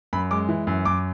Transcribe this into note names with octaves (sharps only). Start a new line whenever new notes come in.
F#2 B5
G#3 D6
E3
F#2
F#2 D6